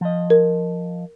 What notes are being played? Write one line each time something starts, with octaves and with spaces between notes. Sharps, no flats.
F3 D#5
A#4